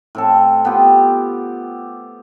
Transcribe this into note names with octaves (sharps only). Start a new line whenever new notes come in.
A2 C4 A4
B3 F4 G4